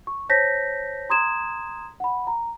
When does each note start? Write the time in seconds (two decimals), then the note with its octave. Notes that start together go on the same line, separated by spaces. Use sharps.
0.07 C#6
0.29 C5 C#5 A5 G6 A#6 B6
1.10 A#5 C6 D#6 G#6 E7
2.00 F#5 B5
2.27 A#5